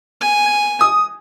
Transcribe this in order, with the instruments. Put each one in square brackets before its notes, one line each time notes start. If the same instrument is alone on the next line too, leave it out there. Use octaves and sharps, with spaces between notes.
[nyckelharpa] G#5
[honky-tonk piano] D#6